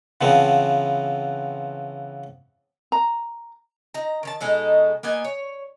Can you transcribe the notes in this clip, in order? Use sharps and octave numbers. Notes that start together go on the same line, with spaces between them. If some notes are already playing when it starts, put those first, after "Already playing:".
C#3 E3 F3 B3 C4
A#5
D#4 A#5
D#3 C#5 A5
B2 G#3 D#4 A4
A#3 B3 D#5 G#5
C#5